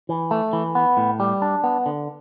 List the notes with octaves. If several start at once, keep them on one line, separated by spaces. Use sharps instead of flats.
E3
A3
E3
B3
A2
G3
D4
B3
D3